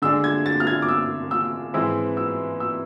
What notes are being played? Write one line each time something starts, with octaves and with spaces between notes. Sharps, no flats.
D3 G#3 D4 E6
G#6
A6
F6
G#6
D6
E6
E6
G#2 E3 G#3 C4 E4 E6
E6
E6